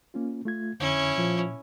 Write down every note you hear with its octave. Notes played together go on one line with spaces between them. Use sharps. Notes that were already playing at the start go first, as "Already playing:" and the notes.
A#3 C#4 F4
A3 F4 G#6
F2 D3 C#4 E4
A#2 F3